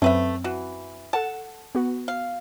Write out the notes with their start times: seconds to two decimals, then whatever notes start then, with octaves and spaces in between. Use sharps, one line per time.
0.02 F#2 F#3 A3 C4 B4 E5
0.44 E3 F#4
1.13 A4 F#5 A5
1.75 B3 F#4
2.08 F5